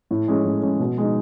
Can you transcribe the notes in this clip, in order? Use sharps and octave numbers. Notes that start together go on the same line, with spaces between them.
A2
G#3 C#4
A2
G#3 C#4
B2
G#3 D#4